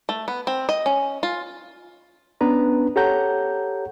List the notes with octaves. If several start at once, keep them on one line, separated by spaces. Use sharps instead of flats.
A3
B3
C4
D#5
C#4
F4
B3 C#4 D4 B4 A#5
G4 A4 C#5 F#5 A#5 G6